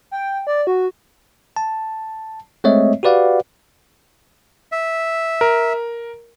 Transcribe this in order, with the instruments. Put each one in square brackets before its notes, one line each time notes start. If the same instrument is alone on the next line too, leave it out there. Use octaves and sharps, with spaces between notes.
[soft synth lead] G5
D5
F#4
[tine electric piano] A5
G#3 A3 C4 C#5 D#5 E5
F#4 G4 B4 D5 F5 F#5
[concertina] E5
[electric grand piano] A#4